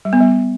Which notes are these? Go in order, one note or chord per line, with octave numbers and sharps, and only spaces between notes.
G3
B3
G3